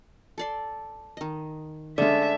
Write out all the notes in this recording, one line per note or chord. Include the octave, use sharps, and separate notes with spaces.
A4 D5 C6
D#3 D#5
D3 G#3 A3 C#4 D5 E5